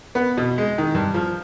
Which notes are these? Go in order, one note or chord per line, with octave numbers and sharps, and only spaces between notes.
B3
B2
G#3
D#3
G2
F3